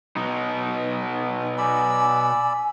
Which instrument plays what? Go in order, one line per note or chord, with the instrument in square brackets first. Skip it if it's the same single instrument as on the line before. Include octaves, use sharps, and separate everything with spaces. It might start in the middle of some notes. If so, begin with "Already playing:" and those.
[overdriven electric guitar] B2 D#4
[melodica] D5 B5 E6 [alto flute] G#5